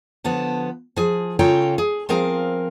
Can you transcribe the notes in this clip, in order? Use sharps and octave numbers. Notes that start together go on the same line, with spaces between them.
D3 F3 B3 A5
F3 G#4
C#3 F4 A4 C#5 G5 A#5
G#4
F3 C4 G#4 A#4 F5